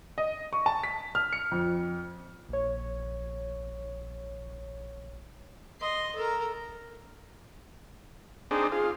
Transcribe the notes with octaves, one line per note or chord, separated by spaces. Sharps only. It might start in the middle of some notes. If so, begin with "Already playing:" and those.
D#5
C#6
A5
B6
F6
C#7
F2
A#1 C#5
D#5 C6
A4 A#4
C4 D4 D#4 G#4
F4 G#4